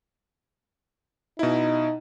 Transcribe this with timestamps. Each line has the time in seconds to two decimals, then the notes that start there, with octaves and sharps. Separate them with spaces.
1.39 B2 D#4 E4